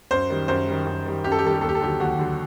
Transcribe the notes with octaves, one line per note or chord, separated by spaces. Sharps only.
F#2 C5
D#3 G3
F#2 C5
D#3 G3
F#2
D#3 G3
F#2 G4
A4
G4
D#3 G3 A4
G4
D#2 A4
G4
A4
D3 F#3 G4
D#2 F#4
D3 F#3